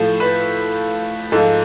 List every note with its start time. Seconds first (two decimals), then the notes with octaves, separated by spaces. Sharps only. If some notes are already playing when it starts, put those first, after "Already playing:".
Already playing: A2 F3 A4
0.20 B4
1.32 G#2 F3 A4